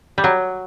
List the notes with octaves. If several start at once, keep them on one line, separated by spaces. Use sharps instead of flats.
G3
F#3